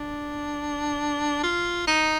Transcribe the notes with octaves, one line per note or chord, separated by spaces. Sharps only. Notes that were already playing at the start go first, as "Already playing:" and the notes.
Already playing: D4
F4
D#4